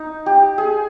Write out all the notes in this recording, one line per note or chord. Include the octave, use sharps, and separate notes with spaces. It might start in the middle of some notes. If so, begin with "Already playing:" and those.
Already playing: D#4
G4
G#4